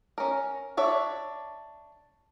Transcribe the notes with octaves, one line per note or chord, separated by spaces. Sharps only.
C#4 A#4
D4 C#5 E5